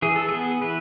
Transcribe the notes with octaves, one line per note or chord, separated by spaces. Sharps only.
E3 G#4
A4
B3 G#4
E3 B4